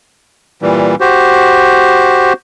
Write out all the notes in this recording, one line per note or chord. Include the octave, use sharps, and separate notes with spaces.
A#2 E3 G3
F#4 G4 C5